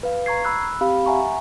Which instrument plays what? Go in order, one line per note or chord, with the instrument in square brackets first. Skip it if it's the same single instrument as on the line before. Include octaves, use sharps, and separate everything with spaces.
[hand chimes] B4 F5
A#5 C#6 G#6 C7
B5 E6 F#6
C4 G4 F5 B5
E5 F#5 G#5 A#5 C#6